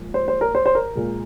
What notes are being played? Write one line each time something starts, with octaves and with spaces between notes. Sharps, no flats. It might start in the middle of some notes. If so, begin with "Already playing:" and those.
Already playing: A#2 F3 G#3
C5
C5
A#4
C5
C5
A#4
A#2 G#3